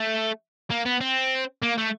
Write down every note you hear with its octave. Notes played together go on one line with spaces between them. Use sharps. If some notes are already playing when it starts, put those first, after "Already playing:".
Already playing: A3
A#3
B3
C4
A#3
A3